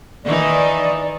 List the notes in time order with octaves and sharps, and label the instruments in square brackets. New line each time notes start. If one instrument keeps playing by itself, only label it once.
[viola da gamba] D#3 E3 D#4 [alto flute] D5